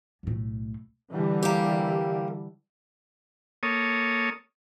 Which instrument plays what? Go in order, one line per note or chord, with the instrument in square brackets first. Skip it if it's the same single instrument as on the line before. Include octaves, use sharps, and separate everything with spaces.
[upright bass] B1 A2
[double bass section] D3 E3 G3
[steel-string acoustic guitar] A#3 G4
[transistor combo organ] A#3 A4 C#5 D#6